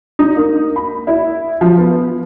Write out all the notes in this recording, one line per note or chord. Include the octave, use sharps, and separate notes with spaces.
D#4
A#3
B5
E4
F3
B3